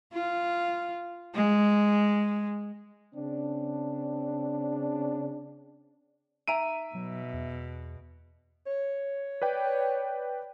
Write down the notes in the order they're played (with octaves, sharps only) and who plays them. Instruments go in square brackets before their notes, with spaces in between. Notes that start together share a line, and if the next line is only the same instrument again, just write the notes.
[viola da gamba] F4
G#3
[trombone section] C#3 C4 D4
[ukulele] D#4 G#5 A#5 [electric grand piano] E5 D7 D#7
[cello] B2 [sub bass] F#3
[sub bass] E2
[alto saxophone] C#5
[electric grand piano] B4 D5 G5